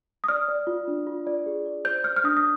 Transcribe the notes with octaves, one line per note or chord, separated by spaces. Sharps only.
D#6
D5 F6
D5
F4
D4
F4
D5
G#4
D5
C5 G6
C5 F6
F6
D4 D#6
D#6